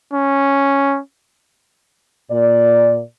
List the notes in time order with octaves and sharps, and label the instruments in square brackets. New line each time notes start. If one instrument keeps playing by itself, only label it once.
[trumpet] C#4
[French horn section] A#2 D5